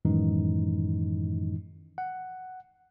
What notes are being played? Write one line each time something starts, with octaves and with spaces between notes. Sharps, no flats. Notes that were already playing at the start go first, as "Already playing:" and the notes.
F#2 A2 D#3 E3 G#3 D#4
F#5